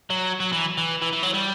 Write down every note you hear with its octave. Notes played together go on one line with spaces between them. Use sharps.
F#3
F#3
E3
E3
E3
E3
F#3
G3